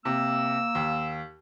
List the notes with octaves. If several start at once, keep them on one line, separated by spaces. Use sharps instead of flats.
C3 A#3 E6
D#2